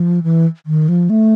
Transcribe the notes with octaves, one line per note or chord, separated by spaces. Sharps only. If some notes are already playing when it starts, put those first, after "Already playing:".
Already playing: F3
E3
D#3
F3
A3